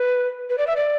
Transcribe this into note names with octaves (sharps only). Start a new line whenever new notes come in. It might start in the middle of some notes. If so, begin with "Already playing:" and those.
Already playing: B4
B4
D5
E5
D5